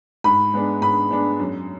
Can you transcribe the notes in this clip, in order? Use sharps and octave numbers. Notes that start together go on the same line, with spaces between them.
G#2 B5
G#3 B3 D4
G#2 B5
G#3 B3 D4
F#2